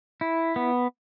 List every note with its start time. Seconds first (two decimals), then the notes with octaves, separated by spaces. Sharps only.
0.21 E4
0.56 B3